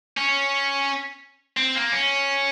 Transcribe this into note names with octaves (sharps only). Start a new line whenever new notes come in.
C#4
C4
A#3
C#4